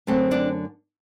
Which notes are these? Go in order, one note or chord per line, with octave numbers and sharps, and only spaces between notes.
F#2 D3 A3 C4
D4 D5